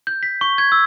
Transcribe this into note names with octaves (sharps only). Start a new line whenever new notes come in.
G6
B6
C#6
G#6
E6